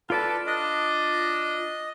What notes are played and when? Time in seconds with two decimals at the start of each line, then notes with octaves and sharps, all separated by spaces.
0.10 F4 A4 B4 D5 A5
0.47 D4 D#5